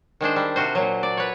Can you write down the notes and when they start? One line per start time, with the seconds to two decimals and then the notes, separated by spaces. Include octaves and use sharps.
0.21 D#3 G#3 D4 C5
0.36 G3
0.56 C3 F4 F#4 C5
0.75 A#2 F#3
1.03 D5
1.17 B4 C#5